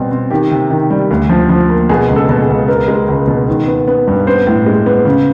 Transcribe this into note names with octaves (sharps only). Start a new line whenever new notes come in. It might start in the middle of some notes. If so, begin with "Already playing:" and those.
Already playing: B2 G3 C4
C4
D#3 G4
C3
D#3
G3
D2
F3
F3
A#3
B2 G#4
C#2
A4
B2
G#4
C#2
B3 A#4
G#3
C#2
B2
D#3
B3
B3
G2
B3 C5
A2
G#3
B3
C#3